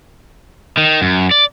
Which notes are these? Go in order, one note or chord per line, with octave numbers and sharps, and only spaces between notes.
D#3
F#2
D5